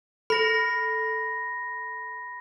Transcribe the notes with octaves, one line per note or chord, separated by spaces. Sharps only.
A4 B5 A#6